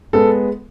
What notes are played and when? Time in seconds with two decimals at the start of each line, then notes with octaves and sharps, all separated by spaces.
0.13 G#3 B3 A4